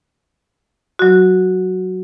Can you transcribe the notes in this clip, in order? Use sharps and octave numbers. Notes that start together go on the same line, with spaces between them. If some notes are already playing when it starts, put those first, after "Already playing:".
F#3 F#4